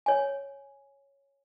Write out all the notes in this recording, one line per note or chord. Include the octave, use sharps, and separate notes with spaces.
C#5 G#5